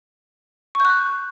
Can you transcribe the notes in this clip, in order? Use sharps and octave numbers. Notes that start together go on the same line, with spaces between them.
C#6 F#6 G6